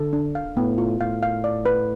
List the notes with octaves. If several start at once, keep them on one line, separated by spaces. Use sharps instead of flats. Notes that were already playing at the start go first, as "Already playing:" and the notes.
Already playing: D3 A4
D4
F5
A2 B3
F4
A2 F5
F5
D5
B4